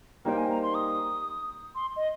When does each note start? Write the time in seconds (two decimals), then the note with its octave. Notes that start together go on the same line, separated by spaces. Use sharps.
0.25 G3 A#3 D#4 G4 C5 G5
0.37 G#5
0.50 A#5
0.63 C6
0.75 D#6
1.75 C6
1.96 D#5